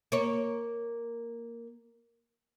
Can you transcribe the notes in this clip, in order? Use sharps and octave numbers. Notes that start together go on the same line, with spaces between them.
A#3 C#5